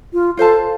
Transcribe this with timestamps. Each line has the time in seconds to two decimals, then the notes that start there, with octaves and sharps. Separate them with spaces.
0.13 F4
0.37 F4 A4 C5 F5 A5